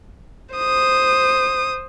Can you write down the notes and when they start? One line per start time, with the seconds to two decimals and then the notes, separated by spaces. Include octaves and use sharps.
0.55 C5 D#6